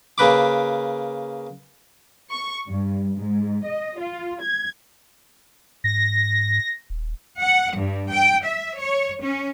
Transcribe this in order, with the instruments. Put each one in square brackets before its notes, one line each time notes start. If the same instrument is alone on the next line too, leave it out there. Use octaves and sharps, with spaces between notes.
[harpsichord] C#3 A#3 B4 B5 D6
[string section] C#6
G2
G#2
D#5
F4
G#6
[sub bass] G#2 [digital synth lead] A#6
[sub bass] D#1
[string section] F#5
G2
G5
E5
C#5
C#4